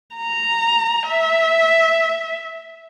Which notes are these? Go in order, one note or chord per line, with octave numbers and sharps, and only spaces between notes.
A#5
E5